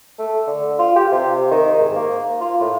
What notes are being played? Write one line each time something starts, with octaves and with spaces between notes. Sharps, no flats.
A3
D3
F4
G4
C3
D#3
G#2
A#3
F4
A2